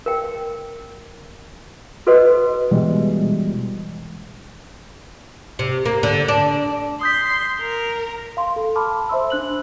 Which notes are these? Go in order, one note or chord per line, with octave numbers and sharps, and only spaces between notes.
A#4 G5
F#4 A4 B4 C5 D#5 F#5
B2 E3 G3 G#3
C3
A#3
D3
D4
C6 D#6 G6 B6
A#4
F5 C6
A4
A5 B5 C6 D6 F6
C5 E5 C6 E6
D4 F#6 F#7